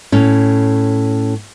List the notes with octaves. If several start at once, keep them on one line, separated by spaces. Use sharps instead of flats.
A2 C#4